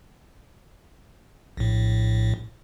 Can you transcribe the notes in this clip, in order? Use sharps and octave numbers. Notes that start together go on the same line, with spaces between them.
A#1 A2